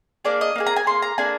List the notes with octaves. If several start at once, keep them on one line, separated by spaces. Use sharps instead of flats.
A#3 D4 G#4 D5
D#5
A#3 D4 G#4
A#5
G#5
A#3 D4 G#4 C6
A#5
A#3 D4 G#4 G#5